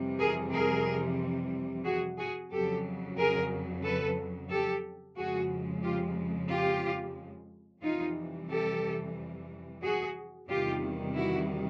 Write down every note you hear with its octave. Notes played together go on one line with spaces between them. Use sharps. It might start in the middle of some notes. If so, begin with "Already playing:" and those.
Already playing: F2 C3 E3 G3
G#4 A#4
G#4 A#4
F#4 G#4
F#4 G#4
F2 C#3 F#3 G4 A4
G#4 A#4
A4 B4
G4 A4
F2 C#3 F3 G#3 F#4 G#4
F4 G4
F4 G4
F2 C3 E3 G3 D#4 F4
G4 A4
F#4 G#4
E2 C3 D#3 G3 F4 G4
E4 F#4